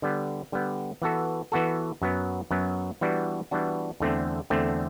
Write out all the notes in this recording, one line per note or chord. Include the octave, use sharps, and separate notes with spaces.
D3 G3 B3
D3 G3 B3
E3 B3 F#4 A4
E3 B3 F#4 A4
F#2 F#3 B3
F#2 F#3 B3
E3 G3 B3 D4 F#4
E3 G3 B3 D4 F#4
E2 D3 A3 C4
E2 D3 A3 C4